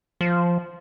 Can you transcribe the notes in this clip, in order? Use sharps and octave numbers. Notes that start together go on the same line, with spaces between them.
F3